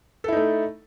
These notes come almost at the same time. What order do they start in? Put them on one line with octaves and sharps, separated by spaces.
A4 E4 D#4 A3